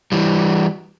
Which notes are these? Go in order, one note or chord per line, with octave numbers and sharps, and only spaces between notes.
E3 G3